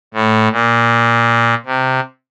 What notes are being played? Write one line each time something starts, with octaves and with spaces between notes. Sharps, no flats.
A2
A#2
C3